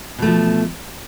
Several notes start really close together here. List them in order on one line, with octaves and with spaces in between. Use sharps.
B2 A3 F3